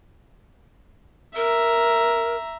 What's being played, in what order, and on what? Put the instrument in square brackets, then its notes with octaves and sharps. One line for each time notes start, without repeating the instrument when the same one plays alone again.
[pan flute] A#4 [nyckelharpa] E5 A#5